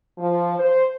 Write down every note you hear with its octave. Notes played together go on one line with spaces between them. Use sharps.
F3
C5